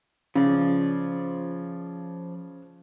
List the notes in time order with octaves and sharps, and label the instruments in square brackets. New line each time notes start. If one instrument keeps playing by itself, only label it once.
[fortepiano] C#3 [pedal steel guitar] F3 D5